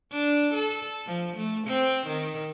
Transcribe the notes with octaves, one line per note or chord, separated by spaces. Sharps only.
D4
A4
F3
A3
C4
D#3